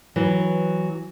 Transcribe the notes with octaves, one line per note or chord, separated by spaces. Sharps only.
E3 F#3